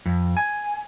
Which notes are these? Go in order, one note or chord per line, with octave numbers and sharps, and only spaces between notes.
F2
G#5